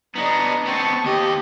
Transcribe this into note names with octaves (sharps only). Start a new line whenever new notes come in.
B3 D4 D#5 A#5
B3 C4 A5 C#6
D#2 G4 D#5